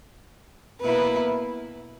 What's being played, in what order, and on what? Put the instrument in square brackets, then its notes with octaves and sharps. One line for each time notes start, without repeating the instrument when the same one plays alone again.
[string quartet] B2 A#3 E4 B4